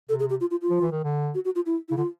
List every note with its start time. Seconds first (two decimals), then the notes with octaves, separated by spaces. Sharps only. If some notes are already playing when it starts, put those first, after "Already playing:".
0.09 C3 A4
0.20 G#4
0.30 G4
0.41 F4
0.51 F4
0.62 F4
0.70 F3
0.81 E3
0.91 D#3
1.04 D3
1.35 F#4
1.45 F#4
1.55 F4
1.66 E4
1.89 C#3 E4
1.97 D3 F4